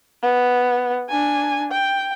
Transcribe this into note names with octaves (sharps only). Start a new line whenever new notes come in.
B3
D4 G#5
G5